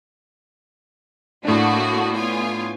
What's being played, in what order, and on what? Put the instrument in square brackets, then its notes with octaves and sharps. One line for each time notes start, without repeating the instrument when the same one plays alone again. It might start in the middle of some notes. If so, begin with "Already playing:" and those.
[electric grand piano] A2 D4 [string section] A3 A#3 F#4
[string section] B3 F4 G#5